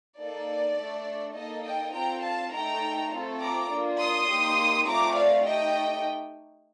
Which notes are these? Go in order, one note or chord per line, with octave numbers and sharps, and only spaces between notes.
A#3 D#4 A4 D5
A3 D4 A4
A#3 D#4 A4 D#5
D#5 G5
C4 F4 A4 G5 A#5
F5 A5
A3 D#4 A4 G5 A#5
A3 C4 F4 A4
A#5 D6
A#3 D4 F4
C6 D#6
A#3 D#4 G4
A3 C4 F4 A#5 D6
D5 F5
A3 D#4 G4 D#5 G5